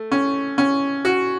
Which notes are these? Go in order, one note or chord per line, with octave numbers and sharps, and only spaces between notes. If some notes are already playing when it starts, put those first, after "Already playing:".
Already playing: A3
C#4
C#4
F#4